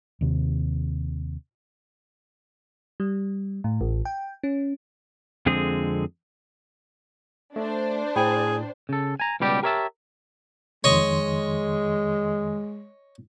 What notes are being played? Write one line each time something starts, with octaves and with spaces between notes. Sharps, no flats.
D#2 C3
G3
A2
A1
G5
C#4
F2 D3 G#3 C4 G#4
A3 D4 C5
A2 G#4 D5 G5 B5
C#3 A4
G#5 A#5
C#2 B2 G3 G4 C#5 D5
G4 A#4 C#5 D#5 E5 A5
F2 D#3 G#3 C#5 D#5 C6 C#6